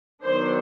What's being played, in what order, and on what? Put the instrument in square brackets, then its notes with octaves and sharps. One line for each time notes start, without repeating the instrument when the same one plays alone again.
[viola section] D#3 F#3 B3 D4 C5